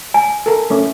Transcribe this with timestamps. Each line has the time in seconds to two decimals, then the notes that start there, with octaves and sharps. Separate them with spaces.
0.14 G#5
0.46 A4 A#4
0.70 A3 C#4